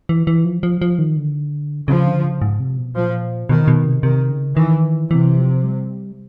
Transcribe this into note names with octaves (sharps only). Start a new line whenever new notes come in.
E3
E3
F3
F3
F3
D#3
D3
C#3 F3
D3
C#3
G#2
C3
B2
A#2 F3
B2 D#3
B2
C3
C3 D#3
C#3
D#3 E3
C3 E3
F3
G3